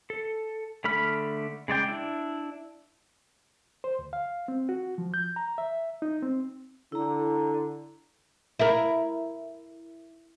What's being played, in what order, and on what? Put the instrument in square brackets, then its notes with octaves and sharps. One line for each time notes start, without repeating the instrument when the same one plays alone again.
[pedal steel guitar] A4
D3 A3 B5 F6
C#3 G#3 D5 G5
D4 E4
[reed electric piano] C5
D2
F5
C4
F#4
F3
G6
A#5
E5
D#4
C4
[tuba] D3 [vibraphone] E4 A#5
[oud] E4 A#4